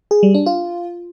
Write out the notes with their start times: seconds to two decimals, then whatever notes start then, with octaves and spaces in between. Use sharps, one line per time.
0.11 G#4
0.23 G3
0.35 D4
0.46 F4